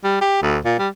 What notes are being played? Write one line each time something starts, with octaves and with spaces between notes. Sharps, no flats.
G3
G4
D2
A#2
G3